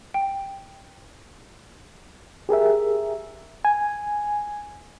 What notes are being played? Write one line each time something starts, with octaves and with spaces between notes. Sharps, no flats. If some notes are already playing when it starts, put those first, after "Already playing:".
G5
G4 G#4 A#4 E5
G#5